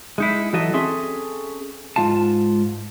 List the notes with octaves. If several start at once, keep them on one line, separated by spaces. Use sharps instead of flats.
G#3 D#4 E4
E3 F#3 F#4 A4 D#5 E5
C4 C#4 G#4 A4 E5 C6
G#2 G#3 F4 F5 A5